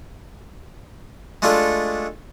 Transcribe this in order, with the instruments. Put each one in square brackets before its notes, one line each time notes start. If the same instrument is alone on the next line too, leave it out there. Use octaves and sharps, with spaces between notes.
[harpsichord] G#3 A3 D4 F4 A4